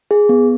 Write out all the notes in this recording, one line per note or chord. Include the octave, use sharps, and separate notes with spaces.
G#4
B3